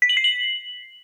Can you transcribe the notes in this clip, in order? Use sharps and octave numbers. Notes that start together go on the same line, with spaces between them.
B6
F#7
C7
F#7